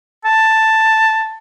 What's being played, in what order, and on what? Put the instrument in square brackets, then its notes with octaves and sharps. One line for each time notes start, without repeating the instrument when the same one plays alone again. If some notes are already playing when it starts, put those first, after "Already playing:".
[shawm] A5